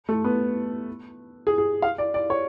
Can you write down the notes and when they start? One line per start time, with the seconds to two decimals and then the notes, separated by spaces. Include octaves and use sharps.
0.09 A3
0.24 B3
1.47 G#4
1.58 G#4
1.82 F5
1.98 D5
2.14 D5
2.30 C#5